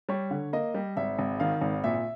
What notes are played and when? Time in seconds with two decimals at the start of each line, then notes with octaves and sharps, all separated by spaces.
0.09 G3 C#5
0.31 D3
0.53 A#3 D#5
0.74 G3
0.97 G#1 E5
1.19 G#1
1.40 D#3 F5
1.61 G#1
1.84 A#2 E5